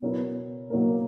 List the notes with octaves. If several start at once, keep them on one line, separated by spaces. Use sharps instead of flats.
B2 F#3 B3 C#4 E4 A#4
B2 F#3 A#3 C#4 E4 A#4